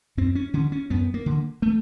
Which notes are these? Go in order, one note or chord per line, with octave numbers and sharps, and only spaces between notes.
F#2 C4
C#4
D3 C#4
C#4
F#2 B3
A#3
D3
A3